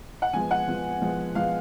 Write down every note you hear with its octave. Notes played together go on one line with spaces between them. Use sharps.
F#5
F3 G#3 B3 G#5
F#5
F3 G#3 B3
F3 G#3 B3
F3 G#3 B3 F5